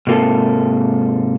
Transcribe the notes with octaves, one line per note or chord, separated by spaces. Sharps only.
G#2 C3 A#3 F4 A4